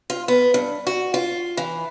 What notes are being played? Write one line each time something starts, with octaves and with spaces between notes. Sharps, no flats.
F4
B3
G2
F#4
F4
E3